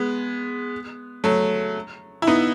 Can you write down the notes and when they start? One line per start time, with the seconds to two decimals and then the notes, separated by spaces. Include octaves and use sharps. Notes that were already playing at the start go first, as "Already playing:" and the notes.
Already playing: G#3 B3
1.24 F#3 A3
2.22 E4
2.27 B3 D#4